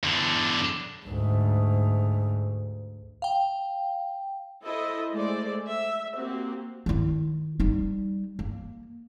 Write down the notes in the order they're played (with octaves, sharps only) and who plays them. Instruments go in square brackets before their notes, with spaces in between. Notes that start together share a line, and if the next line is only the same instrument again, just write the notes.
[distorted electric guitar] E2 D3
[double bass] D2 G#2
[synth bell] F5 G5
[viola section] E4 A4 C5 D#5
G#3 A3 A4 C5 D5
E5
A#3 C4 F#4 G4
[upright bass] D#3 E4
G3 D#4
A#3